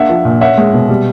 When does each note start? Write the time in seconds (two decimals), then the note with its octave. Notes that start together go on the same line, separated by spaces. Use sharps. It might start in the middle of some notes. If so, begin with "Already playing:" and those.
Already playing: A#3 D4 E5 F#5
0.09 F3
0.25 A#2
0.41 C#4 E5 F#5
0.58 G#3
0.73 B2
0.89 G3